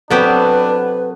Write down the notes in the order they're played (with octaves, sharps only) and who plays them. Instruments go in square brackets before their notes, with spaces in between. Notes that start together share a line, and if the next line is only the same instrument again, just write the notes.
[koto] F#3 B3 G4 [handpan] C4 F#4 A4 [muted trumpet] D4 [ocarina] B4